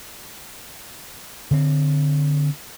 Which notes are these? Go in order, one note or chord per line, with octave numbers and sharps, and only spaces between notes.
D3 C4